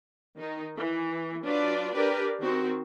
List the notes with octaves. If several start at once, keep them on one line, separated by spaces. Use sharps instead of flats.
D#3 D#4
E3
F#3 D4 F4 B4 D5
D4 G4 A#4 B4 D5
D#3 C4 F#4